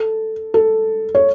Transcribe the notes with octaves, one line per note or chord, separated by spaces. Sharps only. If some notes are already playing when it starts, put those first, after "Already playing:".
Already playing: A4
A4
C#5